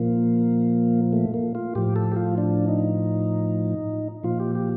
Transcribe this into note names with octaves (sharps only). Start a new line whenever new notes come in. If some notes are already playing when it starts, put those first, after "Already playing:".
Already playing: A#2 F3 A#3
A3
A#3
F4
A2 F3 G4
A4
G4
F4
D4
D#4
A#2 F3 F4
G4
G4